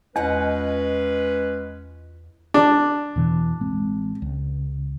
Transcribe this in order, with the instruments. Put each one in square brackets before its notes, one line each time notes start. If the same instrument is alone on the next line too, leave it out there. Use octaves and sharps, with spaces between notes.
[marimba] E2 [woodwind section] G#3 C#4 B4 [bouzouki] F4 D#5 F#5
[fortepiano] D4
[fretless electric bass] E2 B2 E3
A1 G#3 C4
C#2